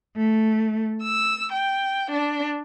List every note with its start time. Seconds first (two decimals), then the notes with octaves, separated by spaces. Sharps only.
0.17 A3
1.02 E6
1.52 G5
2.10 D4